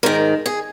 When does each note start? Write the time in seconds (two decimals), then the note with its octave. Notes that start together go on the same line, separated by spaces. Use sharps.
0.03 G#2 D#3 A#4
0.46 G#4